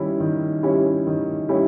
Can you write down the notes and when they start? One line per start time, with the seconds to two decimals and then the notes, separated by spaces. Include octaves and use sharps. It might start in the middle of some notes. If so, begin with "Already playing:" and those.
Already playing: D#3 G3 C#4 E4 G4
0.20 D#3
0.63 G3 C#4 E4 G4
1.07 D#3
1.49 G3 C#4 E4 G4